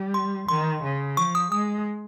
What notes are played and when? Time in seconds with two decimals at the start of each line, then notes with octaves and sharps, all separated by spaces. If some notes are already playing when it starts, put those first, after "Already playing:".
Already playing: G3
0.14 C6
0.49 D#3 C6
0.83 C#3
1.17 F3 C#6
1.35 D#6
1.52 G#3 D#6